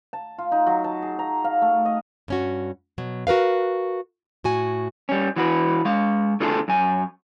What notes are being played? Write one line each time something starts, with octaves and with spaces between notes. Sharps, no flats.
A5
F4
D#4
F#3
A5
G#4
A#5
F5
A3
D#5
G2 C#4 F#4
B2 F#3
F#4 A#4 B4 F5
A2 F#4 G#5
G3 C#4
E3 F#4 B4
G#3 F5
D3 A3 D4 F4 G#4 A4
F#2 G#5